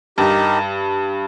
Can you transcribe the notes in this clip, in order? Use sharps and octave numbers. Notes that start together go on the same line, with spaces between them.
G2 D#4 G4 A#4